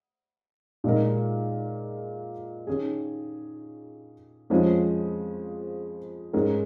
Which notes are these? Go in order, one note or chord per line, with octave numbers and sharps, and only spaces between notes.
A#2 G#3 D#4 A#4
D#3 C#4 G#4
F2 F3 G#3 C#4
G#2 G#3 C#4 A#4